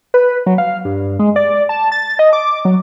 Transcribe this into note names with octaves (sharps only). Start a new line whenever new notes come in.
B4
F#3
F5
G2
G#3
D5
A5
A6
D#5
D6
F#3